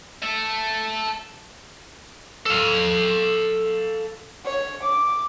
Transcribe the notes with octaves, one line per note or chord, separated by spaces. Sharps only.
A4 E5
A4 F5
C#5
D6